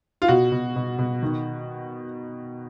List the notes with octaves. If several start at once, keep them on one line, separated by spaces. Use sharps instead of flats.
F4
B2 F#4
B2
B2
B2
D#3